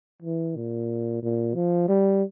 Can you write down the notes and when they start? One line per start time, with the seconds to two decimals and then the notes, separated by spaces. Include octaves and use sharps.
0.22 E3
0.56 A#2
1.23 A#2
1.55 F3
1.88 G3